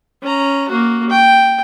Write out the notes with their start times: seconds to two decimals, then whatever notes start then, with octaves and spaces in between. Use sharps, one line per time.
0.22 C#4 A#5
0.68 A#3 F#4
1.10 G5